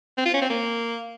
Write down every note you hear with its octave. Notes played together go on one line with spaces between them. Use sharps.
C4
F4
C#4
C4
A#3